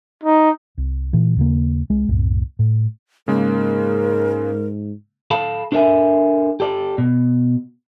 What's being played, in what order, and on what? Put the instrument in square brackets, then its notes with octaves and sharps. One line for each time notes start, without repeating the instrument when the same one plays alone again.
[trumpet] D#4
[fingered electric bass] C2
A#2 E3
D#2 C#3 A#3
C2 G#3
C2 F#2 A2
A2
[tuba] G#2 [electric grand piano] C#3 G#3 A#3 [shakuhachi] A#4
[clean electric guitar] A4 F5 A5 B5
D4 A4 A#4 D5 E5 G#5
G4 A4 D5
B2